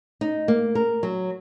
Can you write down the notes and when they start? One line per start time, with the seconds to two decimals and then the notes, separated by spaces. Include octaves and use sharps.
0.21 D#4
0.48 A#3
0.75 A#4
1.03 F#3